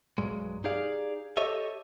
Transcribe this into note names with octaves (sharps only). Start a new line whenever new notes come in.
B1 G2 F#3 G#3
D#4 G4 G#4 D5 F5
G4 A4 C#5 D#5 E5